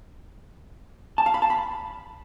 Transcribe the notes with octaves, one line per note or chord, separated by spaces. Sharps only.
A5
F5
B5
A5
B5